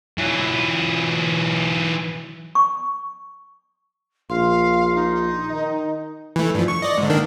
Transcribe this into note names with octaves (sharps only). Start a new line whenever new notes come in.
E3 F#3
C#6
A#1 F5 C6
D#4
D#3 D#5
E3 A3
G2 F3
C#6
D5 D#5
G#2 D3
D#3 A#3 D4